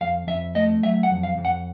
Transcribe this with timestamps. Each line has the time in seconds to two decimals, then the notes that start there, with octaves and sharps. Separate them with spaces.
0.01 F2 F5
0.27 F2 E5
0.55 A3 D#5
0.83 F#3 E5
1.03 F#5
1.10 F2
1.23 F5
1.38 F2
1.45 F#5